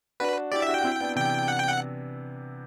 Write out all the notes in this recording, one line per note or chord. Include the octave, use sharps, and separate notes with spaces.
D4 F#4 B4
E4 G4 D5
E5
D4 F#4
G5
F#4
C4 E4
B3 D4
C3 E3 G5
F#5
G5
F#5